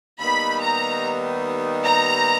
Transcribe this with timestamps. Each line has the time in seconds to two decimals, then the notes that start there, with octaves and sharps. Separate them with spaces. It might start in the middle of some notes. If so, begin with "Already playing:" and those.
0.20 D#2 D#3 G3 B3 D#4 B5
0.62 A#5
1.85 A#5